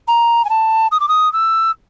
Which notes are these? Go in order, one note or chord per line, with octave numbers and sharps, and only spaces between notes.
A#5
G#5
A5
D#6
D6
D#6
E6